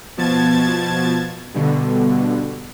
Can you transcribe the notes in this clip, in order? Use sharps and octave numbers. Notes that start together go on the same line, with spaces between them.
B2 F3 A5 G#6 A6
G2 B2 D3